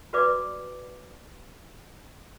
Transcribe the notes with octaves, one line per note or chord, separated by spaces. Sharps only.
F#4 B4 D5 D6